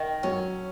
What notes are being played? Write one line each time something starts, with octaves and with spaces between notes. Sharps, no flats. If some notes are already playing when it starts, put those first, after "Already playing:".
Already playing: D#3
F#3 C#4